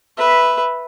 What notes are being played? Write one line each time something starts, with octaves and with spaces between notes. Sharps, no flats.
B4 E5